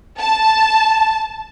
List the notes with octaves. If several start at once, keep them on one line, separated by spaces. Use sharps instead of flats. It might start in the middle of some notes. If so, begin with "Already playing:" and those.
A5